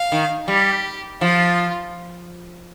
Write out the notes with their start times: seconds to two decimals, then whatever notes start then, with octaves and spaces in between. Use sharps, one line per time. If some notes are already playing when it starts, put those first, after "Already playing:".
Already playing: F5
0.12 D#3
0.47 G3 G4
1.21 F3 F4